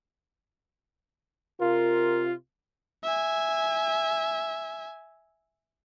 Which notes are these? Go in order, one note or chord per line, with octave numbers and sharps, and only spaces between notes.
C3 F4 A#4
E5 G#5